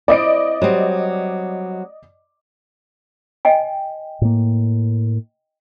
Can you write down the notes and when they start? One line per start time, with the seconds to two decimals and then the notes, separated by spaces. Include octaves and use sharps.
0.08 C4 E4 D5 D#5 D7
0.62 F#3 G3 C4
3.45 D#5 G5 G#5
4.21 A2 A#3